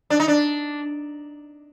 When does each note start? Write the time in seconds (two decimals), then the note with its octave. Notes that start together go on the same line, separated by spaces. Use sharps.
0.10 D4
0.20 D#4
0.28 D4